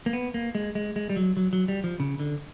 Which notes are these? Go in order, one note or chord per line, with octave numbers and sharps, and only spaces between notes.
A#3
B3
A#3
G#3
G#3
G#3
G3
F#3
F#3
F#3
G3
F3
C#3
D3